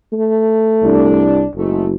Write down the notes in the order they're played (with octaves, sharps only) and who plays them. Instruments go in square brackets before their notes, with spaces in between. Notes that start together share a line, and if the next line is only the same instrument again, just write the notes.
[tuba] A3
[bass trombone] C2 [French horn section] D4
[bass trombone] F#1 [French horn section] G#2 A3